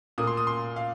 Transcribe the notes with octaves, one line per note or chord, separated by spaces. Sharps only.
A#2 A#3 D#6
C6
D#6
C6
F5